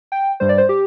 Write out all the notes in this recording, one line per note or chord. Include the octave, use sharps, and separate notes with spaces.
G5
G2 G3 C5
D5
C5
G4